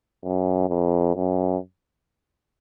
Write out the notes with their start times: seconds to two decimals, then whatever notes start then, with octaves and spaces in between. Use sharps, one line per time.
0.23 F#2
0.69 F2
1.15 F#2